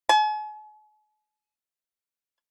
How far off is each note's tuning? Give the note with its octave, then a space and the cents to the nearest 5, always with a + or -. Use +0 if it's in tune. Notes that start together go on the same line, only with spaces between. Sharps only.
G#5 +40